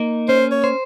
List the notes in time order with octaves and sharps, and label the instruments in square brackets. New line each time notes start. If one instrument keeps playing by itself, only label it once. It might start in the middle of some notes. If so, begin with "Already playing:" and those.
Already playing: [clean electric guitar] A#3 D#4
[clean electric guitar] C#4 [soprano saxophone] C5
[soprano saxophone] C#5
[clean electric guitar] C5